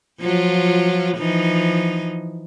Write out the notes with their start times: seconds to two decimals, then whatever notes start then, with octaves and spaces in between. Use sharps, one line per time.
0.20 F3 F#3 F4
1.18 E3 F3 D#4